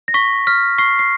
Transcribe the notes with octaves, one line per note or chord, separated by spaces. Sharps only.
A#6
C#6 B6
F6 B6
C#6 C7
C7